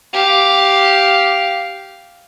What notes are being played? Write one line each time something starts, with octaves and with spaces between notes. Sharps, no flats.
G4 F5